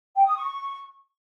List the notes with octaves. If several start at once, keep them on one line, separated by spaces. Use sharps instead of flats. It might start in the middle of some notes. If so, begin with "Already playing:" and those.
G5
D#6
C#6